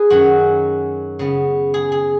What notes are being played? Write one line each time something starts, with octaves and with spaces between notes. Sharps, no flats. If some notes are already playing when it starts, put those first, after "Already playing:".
Already playing: G#4 B4
F#2 D#3 F#3 C#4 F#4
C#3 B3
G#4
G#4